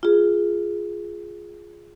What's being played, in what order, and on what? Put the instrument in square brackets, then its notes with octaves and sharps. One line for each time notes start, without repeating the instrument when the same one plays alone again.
[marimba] F4 G#4